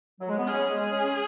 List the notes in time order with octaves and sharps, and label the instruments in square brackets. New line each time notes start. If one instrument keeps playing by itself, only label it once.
[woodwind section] F#3
G#3
B3
[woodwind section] C#4 [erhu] G#4
[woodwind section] G#3
C#4